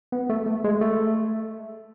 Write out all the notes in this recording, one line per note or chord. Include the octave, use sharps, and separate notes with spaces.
B3
A3
A3
G#3
A3